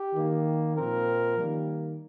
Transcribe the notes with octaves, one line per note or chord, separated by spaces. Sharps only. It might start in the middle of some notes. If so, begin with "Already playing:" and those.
Already playing: G4
D#3 A#3
A#2 F3 C4 A#4
D#3 G3 A#3